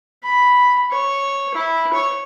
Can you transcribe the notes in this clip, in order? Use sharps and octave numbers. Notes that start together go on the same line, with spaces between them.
B5
C#5
E4
C#5